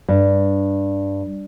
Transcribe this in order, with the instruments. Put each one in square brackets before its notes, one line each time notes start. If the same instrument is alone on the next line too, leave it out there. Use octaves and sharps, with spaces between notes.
[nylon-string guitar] G2